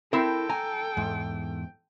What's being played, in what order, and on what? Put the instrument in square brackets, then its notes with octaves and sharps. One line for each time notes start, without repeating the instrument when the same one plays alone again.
[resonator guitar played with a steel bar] C4 E4 [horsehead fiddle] A4 G5 [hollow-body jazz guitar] A#4
[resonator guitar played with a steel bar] G#5 [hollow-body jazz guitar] A#5
[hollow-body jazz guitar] E2 G#2